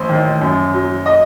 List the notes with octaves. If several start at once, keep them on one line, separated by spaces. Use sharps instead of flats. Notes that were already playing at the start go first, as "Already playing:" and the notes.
Already playing: A1 C5
D#3
F#2
F#3
D#5